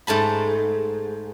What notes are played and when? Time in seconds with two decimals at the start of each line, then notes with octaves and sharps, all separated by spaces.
0.07 G#2 A3 A5 B5